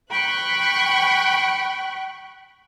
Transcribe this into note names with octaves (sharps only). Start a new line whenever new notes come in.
G5 B5 C#6 F#6